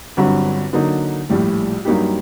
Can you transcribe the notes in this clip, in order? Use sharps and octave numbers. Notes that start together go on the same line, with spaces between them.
G1 G2 F#3 C4 F#4
D3 F#3 A#3 D#4
A#1 A2 G3
G2 F#3 A#3 D#4 G4